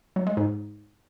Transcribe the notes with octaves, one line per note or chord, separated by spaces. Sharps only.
F#3
G#3
G#2